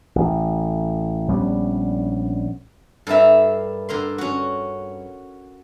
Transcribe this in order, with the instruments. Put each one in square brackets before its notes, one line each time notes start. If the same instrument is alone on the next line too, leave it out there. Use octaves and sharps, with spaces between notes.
[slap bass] A1
A#1 G3 B3 C#4
[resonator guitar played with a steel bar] G2 E5 [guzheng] A4 A#4 F5
[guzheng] D3 A#4 C6
C#4 F#4